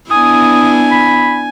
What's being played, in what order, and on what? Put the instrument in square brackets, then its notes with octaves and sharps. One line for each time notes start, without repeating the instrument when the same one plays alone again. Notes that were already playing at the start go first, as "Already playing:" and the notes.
[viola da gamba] B3 D4 E4 [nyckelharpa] G#5 [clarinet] D#6
[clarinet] B5